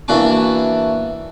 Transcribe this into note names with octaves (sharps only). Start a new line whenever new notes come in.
E3 A#3 D4 F#4 A5 D6